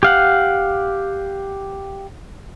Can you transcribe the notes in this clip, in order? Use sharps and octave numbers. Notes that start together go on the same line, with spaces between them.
G4 F5 F#5